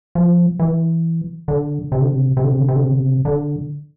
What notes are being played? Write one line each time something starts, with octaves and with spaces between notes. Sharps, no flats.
F3
E3
D3
C3
D3
C3
C3
D3
C3
D3
C3
D3
C3
D3
C3
D3